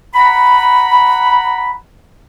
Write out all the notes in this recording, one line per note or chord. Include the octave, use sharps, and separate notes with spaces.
F#5 A#5 B5